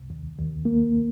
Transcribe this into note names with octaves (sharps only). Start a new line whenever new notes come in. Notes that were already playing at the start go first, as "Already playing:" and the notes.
Already playing: C2
D#2
D#2
A#3